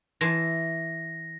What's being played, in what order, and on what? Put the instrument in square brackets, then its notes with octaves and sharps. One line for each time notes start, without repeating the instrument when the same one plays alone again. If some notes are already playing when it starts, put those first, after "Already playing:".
[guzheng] E3 A5 C6 [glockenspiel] A#6